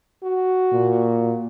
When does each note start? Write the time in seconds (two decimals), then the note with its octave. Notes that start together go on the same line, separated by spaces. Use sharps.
0.23 F#4
0.72 A#2